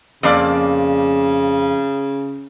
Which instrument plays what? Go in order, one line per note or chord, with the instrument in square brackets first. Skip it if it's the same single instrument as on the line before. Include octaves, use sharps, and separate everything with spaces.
[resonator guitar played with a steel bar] F2 A#3 D5 [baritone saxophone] C#3